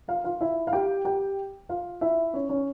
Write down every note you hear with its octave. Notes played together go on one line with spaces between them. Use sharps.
F4 F5
F4 F5
E4 E5
F5
G4 G5
G4 G5
F4 F5
E4 E5
C#4 C#5
C#4 C#5